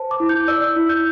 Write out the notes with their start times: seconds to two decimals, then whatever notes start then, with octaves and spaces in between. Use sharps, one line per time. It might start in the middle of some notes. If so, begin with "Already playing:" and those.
Already playing: C5 A5
0.11 D6
0.20 E4
0.29 G6
0.48 D5 E6
0.62 E6
0.76 E4
0.89 G6